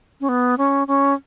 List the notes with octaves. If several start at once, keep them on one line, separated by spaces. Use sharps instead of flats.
C#4
B3
C#4
C#4